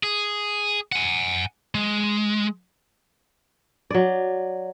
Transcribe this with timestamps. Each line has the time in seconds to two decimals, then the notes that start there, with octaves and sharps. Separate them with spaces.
0.03 G#4
0.92 F#5 G#5
1.75 G#3
3.90 F#3 D5